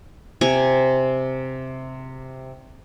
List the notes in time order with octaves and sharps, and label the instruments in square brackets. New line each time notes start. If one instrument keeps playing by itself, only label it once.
[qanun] C3 G#5 A#5